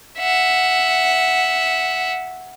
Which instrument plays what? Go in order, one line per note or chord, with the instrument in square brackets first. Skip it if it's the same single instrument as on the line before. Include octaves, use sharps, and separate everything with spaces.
[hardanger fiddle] E5 F#5